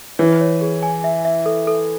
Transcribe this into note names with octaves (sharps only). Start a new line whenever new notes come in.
E3 C#5
C#5
G#4
G#5
E5
E5
A4
A4